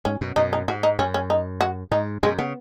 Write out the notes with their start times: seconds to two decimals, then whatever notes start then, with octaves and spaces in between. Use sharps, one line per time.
0.05 G#2 C#4
0.21 F#2 B2
0.36 F#2 B2 D#4
0.53 D#4
0.68 G#2 F#4
0.83 D#4
0.99 F#2 C#4
1.14 C#4
1.30 D#4
1.61 F#4
1.91 G#2 D#4
2.23 F#2 B2 G#3
2.38 C#3 B3